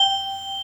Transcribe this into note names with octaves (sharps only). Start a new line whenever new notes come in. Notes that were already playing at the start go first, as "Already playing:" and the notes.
Already playing: G5 G7